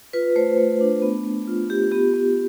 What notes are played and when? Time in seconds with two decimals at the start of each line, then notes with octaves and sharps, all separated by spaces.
0.13 F4 B4
0.36 A3 C5
0.58 A3
0.81 D4
1.02 B3
1.25 B3
1.47 F4
1.69 F4 G4
1.92 B3 G4
2.14 B3